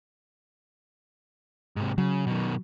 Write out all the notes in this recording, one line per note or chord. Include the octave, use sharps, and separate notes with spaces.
G#2 C3
C#3 F#3
B2 D#3